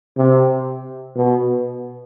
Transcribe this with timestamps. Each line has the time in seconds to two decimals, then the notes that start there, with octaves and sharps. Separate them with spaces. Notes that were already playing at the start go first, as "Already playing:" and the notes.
0.17 C3
1.16 B2